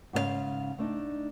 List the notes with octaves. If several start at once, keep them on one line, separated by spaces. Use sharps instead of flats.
G#2 C#3 A#4 F5
A3 D4 D#4